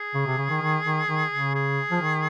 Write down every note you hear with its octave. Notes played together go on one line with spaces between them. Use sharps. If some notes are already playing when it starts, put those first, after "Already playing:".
Already playing: G#4
C#3
C3
C#3
D#3
D#3
D#3
D#3
C#3
G#4
F3
D#3